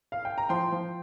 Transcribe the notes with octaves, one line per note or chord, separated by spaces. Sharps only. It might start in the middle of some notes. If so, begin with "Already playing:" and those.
F5
G5
A#5
F3 G5 C6
F3